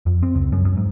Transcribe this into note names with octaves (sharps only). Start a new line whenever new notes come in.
F2
C4
C#2
F#2
F#2
G#2